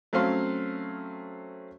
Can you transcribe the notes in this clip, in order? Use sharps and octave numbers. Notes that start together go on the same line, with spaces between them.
F#3 A3 C4 C#4 F5 C6